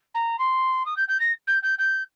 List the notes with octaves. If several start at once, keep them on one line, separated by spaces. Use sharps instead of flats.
A#5
C6
D#6
G6
G6
A#6
G6
G6
G6